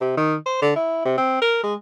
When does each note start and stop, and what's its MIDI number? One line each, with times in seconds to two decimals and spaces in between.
0.01 0.16 48
0.17 0.36 51
0.46 0.58 72
0.62 0.71 50
0.76 1.04 64
1.05 1.13 48
1.18 1.39 60
1.42 1.60 70
1.63 1.74 56